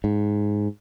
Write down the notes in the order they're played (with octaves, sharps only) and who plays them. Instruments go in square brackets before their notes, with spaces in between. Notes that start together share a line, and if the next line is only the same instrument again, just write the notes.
[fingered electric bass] G#2